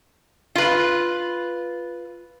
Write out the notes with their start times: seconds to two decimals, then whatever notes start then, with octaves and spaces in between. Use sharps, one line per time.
0.55 F4 B4